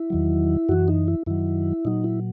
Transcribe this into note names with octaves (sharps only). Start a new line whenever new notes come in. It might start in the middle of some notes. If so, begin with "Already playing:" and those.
Already playing: E4
E2 D#3 F#3
F#2 E3 F#4
D#4
E4
F#2 D#3 F#3 E4
A#2 F#3 D#4
E4